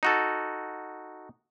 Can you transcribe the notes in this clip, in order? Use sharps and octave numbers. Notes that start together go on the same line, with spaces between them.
D#4 F#4 A4